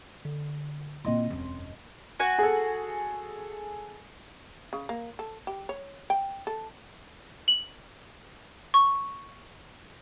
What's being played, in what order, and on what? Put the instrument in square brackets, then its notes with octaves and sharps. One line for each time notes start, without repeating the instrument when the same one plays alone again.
[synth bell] D3
[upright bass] A#2 E4 [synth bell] C4 D#5 C6
[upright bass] E1 F#2
[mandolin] F#4 G#5
[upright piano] G#4 A4
[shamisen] C#3
A#3
A4
G4
C#5
G5
A4
[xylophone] F#7
C#6